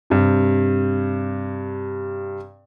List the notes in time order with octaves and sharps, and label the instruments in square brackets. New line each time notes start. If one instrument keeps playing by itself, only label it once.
[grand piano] G2 C3